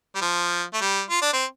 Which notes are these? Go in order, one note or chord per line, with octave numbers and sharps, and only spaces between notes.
G3
F3
A3
G3
F4
D4
C4